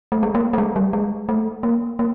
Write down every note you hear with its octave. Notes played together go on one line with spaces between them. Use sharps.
A3
G#3
A#3
A3
G#3
G3
G#3
A3
A#3
A#3